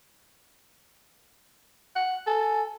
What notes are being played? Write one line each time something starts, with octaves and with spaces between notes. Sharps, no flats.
F#5
A4 G#5